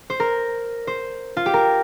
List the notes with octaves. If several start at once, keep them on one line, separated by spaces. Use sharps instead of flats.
C5
A#4
C5
F4
G4
A#4